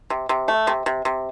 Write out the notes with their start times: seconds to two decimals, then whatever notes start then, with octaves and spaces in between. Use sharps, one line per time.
0.10 C3
0.29 C3
0.48 A3
0.67 C3
0.86 C3
1.05 C3